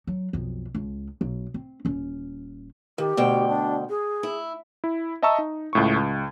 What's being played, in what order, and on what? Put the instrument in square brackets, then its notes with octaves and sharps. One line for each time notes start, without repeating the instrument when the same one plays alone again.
[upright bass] F#3
B1 F2
C#2
B1
C4
D#1 C#4
[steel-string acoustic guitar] D#3 [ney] G4
[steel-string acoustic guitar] D2 B2 G5
[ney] D4
G#4
[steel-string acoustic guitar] E4
[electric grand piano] E4
D#5 E5 A5 A#5 C#6 E6
D#4
C#2 A2 C#6
C#2